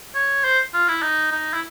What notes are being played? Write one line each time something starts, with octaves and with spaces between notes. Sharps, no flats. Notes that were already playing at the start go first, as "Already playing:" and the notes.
C#5
C5
F4
E4
D#4
D#4
E4